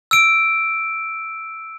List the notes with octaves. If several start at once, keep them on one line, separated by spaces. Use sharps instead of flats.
E6 D7